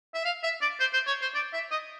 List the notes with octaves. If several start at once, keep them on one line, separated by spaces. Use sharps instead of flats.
E5
F5
E5
D5
C5
C5
C#5
C5
D5
E5
D#5